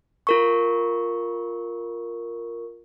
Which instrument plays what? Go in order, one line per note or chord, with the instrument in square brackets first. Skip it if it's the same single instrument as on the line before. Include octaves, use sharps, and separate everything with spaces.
[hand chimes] F4 A#4 C#6